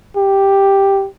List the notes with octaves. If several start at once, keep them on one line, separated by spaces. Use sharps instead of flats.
G4